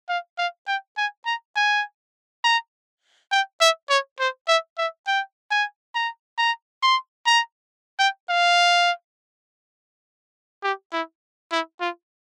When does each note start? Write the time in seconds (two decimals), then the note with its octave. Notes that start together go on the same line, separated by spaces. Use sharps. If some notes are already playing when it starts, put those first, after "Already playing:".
0.09 F5
0.38 F5
0.67 G5
0.97 G#5
1.26 A#5
1.56 G#5
2.44 A#5
3.32 G5
3.61 E5
3.90 C#5
4.20 C5
4.48 E5
4.78 E5
5.07 G5
5.51 G#5
5.95 A#5
6.38 A#5
6.83 C6
7.27 A#5
7.99 G5
8.30 F5
10.63 G4
10.93 E4
11.52 E4
11.80 F4